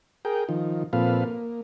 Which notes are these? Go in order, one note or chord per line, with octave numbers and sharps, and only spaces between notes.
G#4 A#4 G5
D#3 F3
A#2 F3 C4 A4 B4 F5
A#3